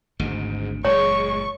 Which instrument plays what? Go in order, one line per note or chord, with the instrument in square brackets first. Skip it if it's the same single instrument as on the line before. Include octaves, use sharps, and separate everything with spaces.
[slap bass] G#1 D2 C#3 [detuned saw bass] G#2
[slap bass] F#1 E2 A#2 [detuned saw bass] G#3 [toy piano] C#5 [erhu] C#6